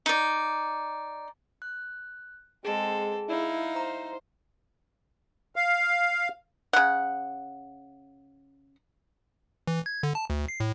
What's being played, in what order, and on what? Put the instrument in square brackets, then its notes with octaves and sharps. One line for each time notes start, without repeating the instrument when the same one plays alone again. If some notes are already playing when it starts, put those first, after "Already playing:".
[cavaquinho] D#4 D5
[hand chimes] F#6
[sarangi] G#3 [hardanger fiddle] C4 A4 [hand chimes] G#4
[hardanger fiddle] D#4 F5 [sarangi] E4
[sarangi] C5 [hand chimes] A#5
[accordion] F5
[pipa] C#3 F#5
[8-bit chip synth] E3
G#6
D3
A5
D2
C7
A2